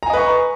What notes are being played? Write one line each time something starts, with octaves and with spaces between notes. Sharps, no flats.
B4 D#5 G#5 A#5 C#6